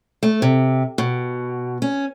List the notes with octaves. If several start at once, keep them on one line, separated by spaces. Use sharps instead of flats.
A3
C3
B2
C#4